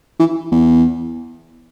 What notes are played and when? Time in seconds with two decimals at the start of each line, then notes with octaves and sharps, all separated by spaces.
0.20 E3
0.52 E2